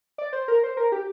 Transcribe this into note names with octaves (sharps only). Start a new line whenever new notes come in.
D5
C5
A#4
C5
A#4
G4